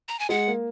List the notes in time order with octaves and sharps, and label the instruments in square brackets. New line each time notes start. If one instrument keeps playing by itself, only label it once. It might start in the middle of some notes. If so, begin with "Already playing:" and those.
[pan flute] A#5
G#5
[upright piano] G#3 [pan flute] F#5
[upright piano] A#3